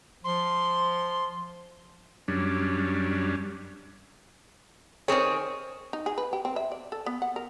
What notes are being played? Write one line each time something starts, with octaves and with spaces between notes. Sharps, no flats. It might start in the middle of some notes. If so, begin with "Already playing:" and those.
F3 C6
F#2 G3 C#4 D4
D#3 C4 G#4 C#5
D#4
G#4
B4
G4
C4
E5
D5
A4
B3
F#5
A#4